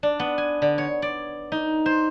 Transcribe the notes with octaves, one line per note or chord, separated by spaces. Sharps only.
D4
B3
G#5
D3
C#5
D5
D#4
C5